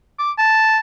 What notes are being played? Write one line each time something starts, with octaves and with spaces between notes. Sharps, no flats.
D6
A5